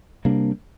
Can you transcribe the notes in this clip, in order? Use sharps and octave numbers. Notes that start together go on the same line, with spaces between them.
C3 G3 A#3 D4